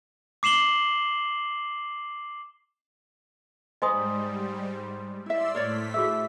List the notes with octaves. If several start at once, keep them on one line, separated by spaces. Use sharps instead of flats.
D6 C7 E7 F#7 G7
G#2 G3 C5 D#5 G#5 A#5 B5 D#6
E4 D5 E5 C6 E6
A2 A3 A#4 C#5 D5 B6
F#4 G#4 E5 E6